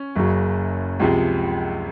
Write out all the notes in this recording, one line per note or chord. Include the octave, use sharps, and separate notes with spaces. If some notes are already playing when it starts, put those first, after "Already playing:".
Already playing: C#4
F#1 F#2 C#3 F#3
C#2 C3 F3 G#3